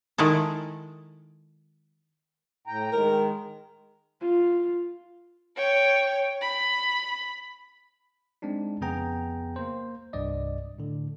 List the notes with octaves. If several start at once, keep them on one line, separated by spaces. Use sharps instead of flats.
D#3 G#3 E4 A4
A2 G5 A#5
D#3 G#3 A#4
F4
C#5 G5
B5
G#3 C4 D4 D#4
F2 C#3 B3 G#4 G5 A#5
A#3 C5
C2 G2 D5 D#5
A2 D3